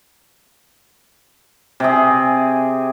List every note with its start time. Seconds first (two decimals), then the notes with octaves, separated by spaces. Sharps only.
1.80 C3 G#4